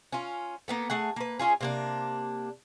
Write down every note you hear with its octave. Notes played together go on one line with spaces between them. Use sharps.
C#4 F4
A#3 B3 A4
A3 G#4 F#5
A#3 B4
C#4 F4 G#4
C3 A#3 D4